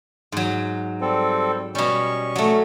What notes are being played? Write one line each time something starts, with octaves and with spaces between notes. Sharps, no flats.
G#2 F#3
G3 C4 A4
B2 G3 C#4 C#6
F#3 A3